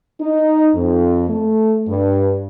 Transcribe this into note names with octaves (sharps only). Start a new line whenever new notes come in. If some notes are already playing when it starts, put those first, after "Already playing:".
D#4
F2
A3
G2